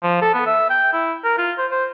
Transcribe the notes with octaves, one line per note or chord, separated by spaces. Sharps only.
F3
A4
B3
E5
G5
E4
A#4
F4
C5
C5